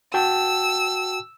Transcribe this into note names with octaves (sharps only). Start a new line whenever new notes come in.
F#4 G5 A5 E6